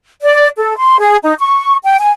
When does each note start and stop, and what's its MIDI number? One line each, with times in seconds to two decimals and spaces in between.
0.23 0.48 74
0.58 0.77 69
0.77 0.96 84
0.98 1.16 68
1.23 1.33 63
1.38 1.76 85
1.84 1.96 79
1.99 2.12 80